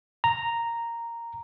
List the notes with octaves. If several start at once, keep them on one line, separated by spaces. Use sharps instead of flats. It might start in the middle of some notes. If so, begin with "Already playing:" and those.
A#5